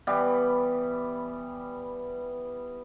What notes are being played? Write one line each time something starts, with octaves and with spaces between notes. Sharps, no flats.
E3 G3 B3